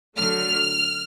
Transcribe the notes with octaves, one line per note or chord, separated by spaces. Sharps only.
D3 F#3 A3 F6